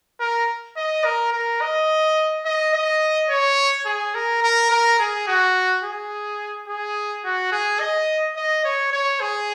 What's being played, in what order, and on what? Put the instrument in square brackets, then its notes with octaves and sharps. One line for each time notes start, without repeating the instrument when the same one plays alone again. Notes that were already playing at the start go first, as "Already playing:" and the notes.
[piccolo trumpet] A#4
D#5
A#4
A#4
D#5
D#5
D#5
C#5
G#4
A#4
A#4
A#4
G#4
F#4
G#4
G#4
F#4
G#4
D#5
D#5
C#5
C#5
G#4